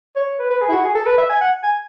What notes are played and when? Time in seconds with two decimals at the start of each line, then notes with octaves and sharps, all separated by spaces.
0.16 C#5
0.39 B4
0.50 B4
0.61 G#4
0.69 E4
0.72 F#4
0.85 G#4
0.95 A4
1.06 B4
1.18 E5
1.29 G#5
1.41 F#5
1.63 G#5